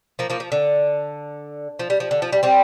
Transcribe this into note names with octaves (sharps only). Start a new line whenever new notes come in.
F3 A#3
F3 A#3
F3
D3
F3
G3
F3
D3
F3
G3
G3 C4